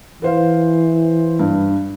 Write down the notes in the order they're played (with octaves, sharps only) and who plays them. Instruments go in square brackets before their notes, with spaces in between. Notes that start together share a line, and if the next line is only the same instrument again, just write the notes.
[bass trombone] E3 [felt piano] B4 C5 F5
[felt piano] G2